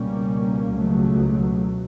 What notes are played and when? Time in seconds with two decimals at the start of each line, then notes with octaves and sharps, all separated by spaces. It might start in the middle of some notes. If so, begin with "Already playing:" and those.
Already playing: C#2 B2 G3 A#3 C#4
0.72 C#2 B2 F#3 A3